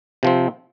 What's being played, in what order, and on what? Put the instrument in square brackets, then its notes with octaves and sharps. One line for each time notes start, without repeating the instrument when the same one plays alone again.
[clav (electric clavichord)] C3 F3 C4